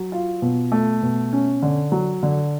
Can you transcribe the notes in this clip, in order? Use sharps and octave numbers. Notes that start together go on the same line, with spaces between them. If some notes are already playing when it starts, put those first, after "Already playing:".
Already playing: F#3
F4
B2
A3
B2
C#4
D3
F#3
D3